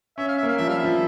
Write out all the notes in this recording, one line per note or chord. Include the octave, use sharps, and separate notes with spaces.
C#4 E5
F5
A#3 E5
F5
F3 E5
G3 F5
E5
F3